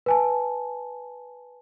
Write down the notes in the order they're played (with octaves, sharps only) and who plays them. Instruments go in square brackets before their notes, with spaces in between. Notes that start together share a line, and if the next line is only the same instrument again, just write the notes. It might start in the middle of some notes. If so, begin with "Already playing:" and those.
[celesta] B4 G#5 A5